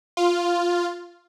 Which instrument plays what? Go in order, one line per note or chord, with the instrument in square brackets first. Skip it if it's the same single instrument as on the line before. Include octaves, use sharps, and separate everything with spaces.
[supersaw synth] F4